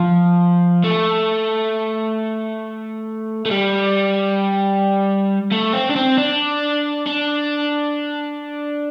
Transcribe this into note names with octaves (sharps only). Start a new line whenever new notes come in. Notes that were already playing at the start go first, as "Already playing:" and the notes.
Already playing: F3
A3
A3
G3
A3
C4
D4
C4
D4
D4